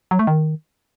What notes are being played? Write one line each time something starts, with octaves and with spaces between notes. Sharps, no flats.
F#3
A3
D#3